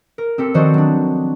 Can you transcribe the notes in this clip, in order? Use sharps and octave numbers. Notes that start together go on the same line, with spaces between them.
A#4
C4 G4 A4
D#3 F3 F#4 C5 D5 D#5
F#3 D4